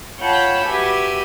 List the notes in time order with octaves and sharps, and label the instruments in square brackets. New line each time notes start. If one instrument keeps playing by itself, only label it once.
[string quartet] F4 C#5 F#5 G5 A5 B5
F#4 G4 B4 E5 G#5